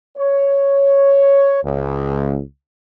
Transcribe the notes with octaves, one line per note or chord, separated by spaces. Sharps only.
C#5
C#2